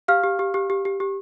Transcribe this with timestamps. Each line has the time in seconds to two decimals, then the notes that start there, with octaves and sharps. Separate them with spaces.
0.08 G4 F5 F6
0.24 G4
0.39 G4
0.54 G4
0.70 G4
0.85 G4
1.00 G4